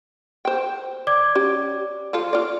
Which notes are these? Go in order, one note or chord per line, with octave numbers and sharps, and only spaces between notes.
C5 G5
D5 D6 G#6
C#4 G4
F3 F4 A4
F4 D5